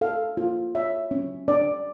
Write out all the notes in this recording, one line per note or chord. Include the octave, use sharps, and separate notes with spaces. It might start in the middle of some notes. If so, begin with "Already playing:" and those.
A4 F5
F4
C#5 E5
C#4
D4 D5